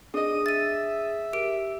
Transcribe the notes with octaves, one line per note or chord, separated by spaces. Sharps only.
D4 G#4 D#5 D#6
E5 A6 D#7
G4 A#4 D7